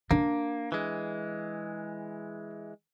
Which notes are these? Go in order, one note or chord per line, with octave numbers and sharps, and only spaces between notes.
A#3 D4
E3 G#3